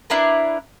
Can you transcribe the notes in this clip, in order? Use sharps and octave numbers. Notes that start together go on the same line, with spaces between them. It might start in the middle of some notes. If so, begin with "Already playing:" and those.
D4 E4 A#4 B4